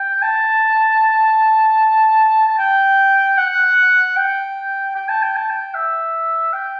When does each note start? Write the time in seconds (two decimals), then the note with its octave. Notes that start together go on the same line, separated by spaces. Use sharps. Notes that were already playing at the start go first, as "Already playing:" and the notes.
Already playing: G5
0.23 A5
2.48 A5
2.58 G5
3.38 F#5
4.17 G5
4.96 G5
5.09 A5
5.23 G5
5.36 A5
5.50 G5
5.74 E5
6.53 G5